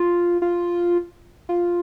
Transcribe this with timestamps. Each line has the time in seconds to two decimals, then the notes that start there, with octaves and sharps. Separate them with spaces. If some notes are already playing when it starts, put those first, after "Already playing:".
Already playing: F4
0.42 F4
1.49 F4